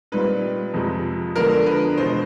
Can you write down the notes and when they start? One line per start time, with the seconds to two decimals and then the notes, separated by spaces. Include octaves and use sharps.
0.12 A#2 G3 C4 D#4 B4
0.73 F2 C3 F3 G#3
1.36 D3 F3 G#3 B3 D4 A#4
1.66 B4
1.97 E2 B2 G#3 C5